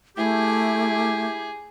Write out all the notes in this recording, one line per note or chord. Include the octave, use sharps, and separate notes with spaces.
A3 E4 G4 G#4